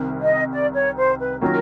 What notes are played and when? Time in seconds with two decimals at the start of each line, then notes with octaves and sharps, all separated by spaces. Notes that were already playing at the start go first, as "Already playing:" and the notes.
Already playing: C2 C3 D#3
0.22 D#5
0.52 D5
0.74 C#5
0.97 C5
1.19 B4
1.41 D#3 F#3 A#3 C#4 F4 A#4